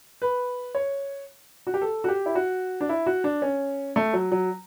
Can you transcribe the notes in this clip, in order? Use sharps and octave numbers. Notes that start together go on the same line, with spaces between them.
B4
C#5
F#4
G4
A4
F#4
G4
E4
F#4
D4
E4
F#4
D4
C#4
A3
F#3
F#3